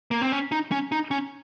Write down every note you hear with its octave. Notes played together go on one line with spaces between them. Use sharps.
A#3
C4
C#4
D#4
C#4
D#4
C#4